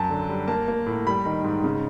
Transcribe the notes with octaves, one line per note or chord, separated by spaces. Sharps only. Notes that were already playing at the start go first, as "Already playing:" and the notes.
Already playing: F#2 A5
D3
G3
A#3 A5
A#3
A2
G3 B5
D#3
G#2
C#3